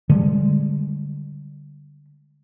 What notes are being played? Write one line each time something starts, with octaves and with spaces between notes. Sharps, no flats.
D3 G3 G#3